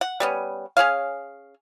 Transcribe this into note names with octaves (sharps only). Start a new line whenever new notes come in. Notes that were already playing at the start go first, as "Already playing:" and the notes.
F#5
G3 B3 C#4
C#4 G#4 C#5 F5